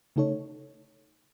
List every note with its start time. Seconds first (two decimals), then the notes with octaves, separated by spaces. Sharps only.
0.16 C#3 A3 D#4 A4 C#5